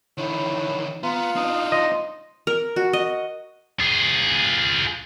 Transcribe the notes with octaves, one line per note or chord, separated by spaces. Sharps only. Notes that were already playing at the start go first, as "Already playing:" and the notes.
D3 D#3 E4 C#5
B3 F4 A#5
D4 D#4 D#6
D#5 C6
A#4
F#4
D#5
F4 G#4